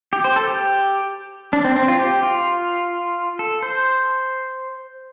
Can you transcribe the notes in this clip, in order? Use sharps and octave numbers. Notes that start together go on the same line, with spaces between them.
G4
C5
A4
G4
D4
C4
C4
F4
G4
F4
A4
C5